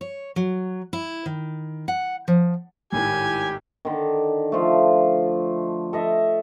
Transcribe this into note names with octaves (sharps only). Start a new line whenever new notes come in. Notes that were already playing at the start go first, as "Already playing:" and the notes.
C#5
F#3
E4
D#3
F#5
F3
G#1 A2 D#3 G4 G#5
D3 D#3
F3 A3
A4 D#5 E5